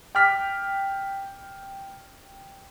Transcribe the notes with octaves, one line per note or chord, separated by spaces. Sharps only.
G5 D6 F6 B6